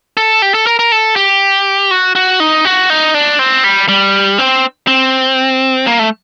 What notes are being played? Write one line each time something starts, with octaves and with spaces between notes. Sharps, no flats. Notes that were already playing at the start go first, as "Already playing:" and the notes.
A4
G4
A4
A#4
A#4
A4
G4
F#4
F#4
D#4
F#4
D#4
D4
C4
G3
G3
C4
C4
A#3
A3